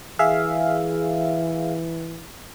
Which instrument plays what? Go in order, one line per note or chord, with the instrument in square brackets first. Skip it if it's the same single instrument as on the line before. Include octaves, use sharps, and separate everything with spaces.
[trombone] E3 [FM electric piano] G#4 E5 F5